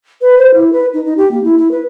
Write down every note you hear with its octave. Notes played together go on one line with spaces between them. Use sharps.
B4
C5
E4
B4
D#4
D#4
G4
A#3
E4
E4
B4